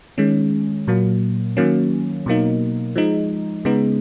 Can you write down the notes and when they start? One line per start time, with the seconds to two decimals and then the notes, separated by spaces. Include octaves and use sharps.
0.18 D#3 G#3 C#4
0.88 A#2 F#3 A#3
1.57 D#3 F#3 A#3 C#4
2.26 B2 F#3 A#3 D#4
2.96 F3 G#3 D#4
3.65 C#3 G#3 B3 D#4